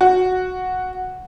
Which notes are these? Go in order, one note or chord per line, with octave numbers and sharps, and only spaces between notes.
F#4